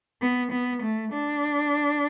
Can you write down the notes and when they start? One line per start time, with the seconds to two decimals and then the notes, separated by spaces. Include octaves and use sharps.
0.22 B3
0.52 B3
0.83 A3
1.13 D4